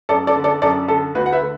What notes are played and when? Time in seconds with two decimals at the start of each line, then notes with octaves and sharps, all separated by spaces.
0.09 F#2 A4 D5
0.27 A4 D5
0.36 D3
0.44 A4 D5
0.62 F#2 A4 D5
0.88 D3 A4
1.15 D2 F#4 B4
1.26 F#5
1.33 B4 E5
1.41 D3